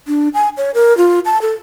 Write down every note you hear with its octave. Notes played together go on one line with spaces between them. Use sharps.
D4
G#5
C#5
A#4
F4
A5
A4